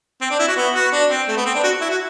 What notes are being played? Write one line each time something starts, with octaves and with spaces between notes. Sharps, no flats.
C4
D4
E4
F#4
B3
F#4
D4
C4
A3
B3
C4
D4
F#4
E4
F#4